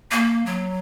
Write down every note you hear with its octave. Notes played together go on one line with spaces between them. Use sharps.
A#3
F#3